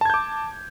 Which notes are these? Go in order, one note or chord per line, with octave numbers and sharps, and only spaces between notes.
A5 D6 G6 G#6